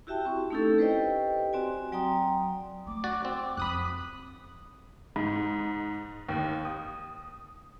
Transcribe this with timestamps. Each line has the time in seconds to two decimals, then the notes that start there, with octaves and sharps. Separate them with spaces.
0.07 E4 F#4 G4 E5 G5 A5
0.25 C4 C#6
0.50 A3 C#4 D#4 E4 G4 A4
0.78 G4 B4 C5 D5 D#5 G5
1.53 C4 F#4 D5 G#5
1.92 F#3 D5 G5 A#5 C6 D#6
2.87 A3 D6
3.04 F#4 D5
3.25 C4
3.57 F2 F#3 B5 D#6 F#6
5.16 G#2
6.29 D#2
6.65 D#6